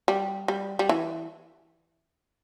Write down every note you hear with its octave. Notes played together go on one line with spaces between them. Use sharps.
G3
G3
G3
E3